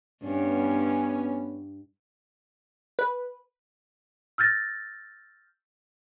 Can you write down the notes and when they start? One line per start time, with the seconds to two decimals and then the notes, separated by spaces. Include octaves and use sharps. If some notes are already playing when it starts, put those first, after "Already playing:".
0.24 G2 B3 C#4
2.99 B4
4.38 E6 F6 G6 A6 A#6